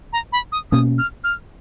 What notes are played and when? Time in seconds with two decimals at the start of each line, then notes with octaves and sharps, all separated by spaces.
0.13 A#5
0.32 B5
0.52 D#6
0.72 B2 A#3 C#4 D#6
0.98 F6
1.24 F6